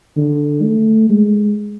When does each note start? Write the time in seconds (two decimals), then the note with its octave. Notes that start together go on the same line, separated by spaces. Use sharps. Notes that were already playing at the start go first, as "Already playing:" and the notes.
0.16 D3
0.63 A3
1.10 G#3